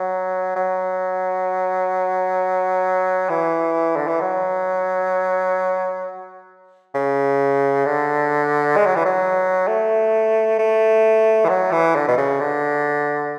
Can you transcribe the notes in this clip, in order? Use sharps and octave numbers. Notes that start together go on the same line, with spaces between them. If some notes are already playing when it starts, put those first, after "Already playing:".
Already playing: F#3
F#3
E3
D3
E3
F#3
C#3
D3
G#3
F#3
E3
F#3
A3
A3
E3
F#3
E3
D3
B2
C#3
D3